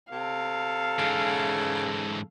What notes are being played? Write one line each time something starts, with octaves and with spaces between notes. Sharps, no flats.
C3 A4 F5
G#2 C#3 E3